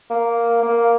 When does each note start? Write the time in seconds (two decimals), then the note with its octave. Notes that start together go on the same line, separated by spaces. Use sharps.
0.10 A#3
0.63 A#3